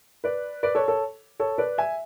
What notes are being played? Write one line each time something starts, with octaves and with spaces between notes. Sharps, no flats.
B4 D5
B4 D5
A4 C#5
A4 C#5
A4 C#5
B4 D5
E5 G#5